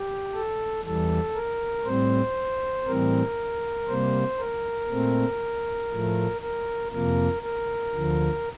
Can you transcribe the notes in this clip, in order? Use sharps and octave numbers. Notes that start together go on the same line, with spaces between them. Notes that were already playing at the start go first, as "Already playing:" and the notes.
Already playing: G4
A4
E2 E3 G3 A4
A#4
A2 G3 C4 C5
A2 E3 G3 C4 A#4
C3 G3 A#3 C5
A#4
A#2 A3 C4
A2 F3 A3
A#4
F2 C3 F3 A#3 A#4
A#4
D2 D3 F3